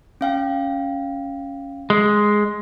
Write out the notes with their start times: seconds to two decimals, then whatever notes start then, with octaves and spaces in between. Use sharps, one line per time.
0.21 C#4 F5 G5
1.90 G#3